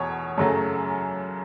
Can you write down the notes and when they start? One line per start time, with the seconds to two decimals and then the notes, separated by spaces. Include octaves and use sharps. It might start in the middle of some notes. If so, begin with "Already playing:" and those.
Already playing: E2 B2 C#5
0.38 F#2 C#3 F#3 A3